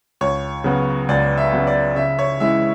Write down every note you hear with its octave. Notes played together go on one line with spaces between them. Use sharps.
C#2 C#5
C#3 F#3 B3
C#2 D5
E5
C#3 F#3 B3
D5
C#3 E5
C#5
E3 G#3 C#4 E4 E5